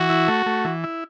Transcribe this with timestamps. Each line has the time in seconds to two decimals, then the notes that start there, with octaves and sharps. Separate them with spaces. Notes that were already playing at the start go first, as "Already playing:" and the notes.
Already playing: E3 F#4
0.09 E4
0.28 A3
0.46 A3
0.65 E3
0.84 E4